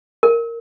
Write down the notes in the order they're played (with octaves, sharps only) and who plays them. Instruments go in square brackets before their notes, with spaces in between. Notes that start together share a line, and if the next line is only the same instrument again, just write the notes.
[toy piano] A#4